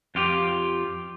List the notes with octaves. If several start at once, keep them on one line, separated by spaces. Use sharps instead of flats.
F2 F4 G4